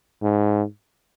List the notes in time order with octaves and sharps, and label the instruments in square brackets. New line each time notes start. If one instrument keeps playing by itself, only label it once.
[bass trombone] G#2